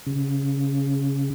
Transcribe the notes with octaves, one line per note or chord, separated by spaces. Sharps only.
C#3